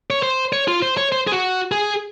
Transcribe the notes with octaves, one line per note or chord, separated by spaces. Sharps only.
C#5
C5
C#5
F4
C5
C#5
C5
G#4
F#4
G#4